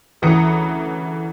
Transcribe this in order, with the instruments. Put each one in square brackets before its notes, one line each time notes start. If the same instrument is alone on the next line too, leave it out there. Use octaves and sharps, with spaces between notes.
[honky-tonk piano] D2 C#3 E3 A#5 D#6 C#7